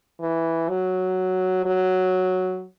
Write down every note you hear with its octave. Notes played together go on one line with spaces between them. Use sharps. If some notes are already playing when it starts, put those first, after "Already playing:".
E3
F#3
F#3